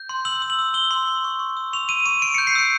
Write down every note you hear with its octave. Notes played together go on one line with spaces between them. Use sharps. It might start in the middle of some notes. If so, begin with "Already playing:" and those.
Already playing: G6
C6
E6 F#7
E6
F#7
E6
E6 G7
C6
E6
C#6
C#6
E6
C#6 F7
E6 D#7
C#6 D#7
C#6 D7
G6 C#7
C7
E6 C#7